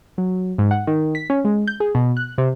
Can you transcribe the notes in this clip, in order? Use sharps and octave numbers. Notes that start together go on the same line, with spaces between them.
F#3
G#2
F#5
D#3
B6
C#4
G#3
G6
G#4
B2
F#6
C3